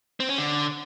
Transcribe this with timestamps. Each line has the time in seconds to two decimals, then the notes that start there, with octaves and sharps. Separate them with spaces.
0.20 C4
0.29 C#4
0.38 D3